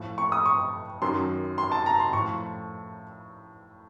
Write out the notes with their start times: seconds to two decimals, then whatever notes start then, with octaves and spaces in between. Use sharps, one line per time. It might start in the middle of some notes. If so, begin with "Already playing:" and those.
Already playing: A2 F3
0.18 C#6
0.32 D#6
0.46 C#6
1.02 F#2 D#3 F#3 C6
1.58 C6
1.72 A5
1.86 A#5
2.00 C6
2.13 A2 C#6
2.19 F3